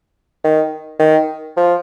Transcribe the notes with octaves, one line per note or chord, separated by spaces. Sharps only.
D#3
D#3
F3